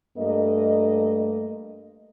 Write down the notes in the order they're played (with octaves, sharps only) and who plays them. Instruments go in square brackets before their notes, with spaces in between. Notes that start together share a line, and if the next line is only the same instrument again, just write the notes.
[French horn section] G2 A3 A#3 A4 D#5